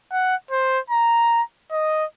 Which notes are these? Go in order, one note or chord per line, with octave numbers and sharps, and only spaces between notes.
F#5
C5
A#5
D#5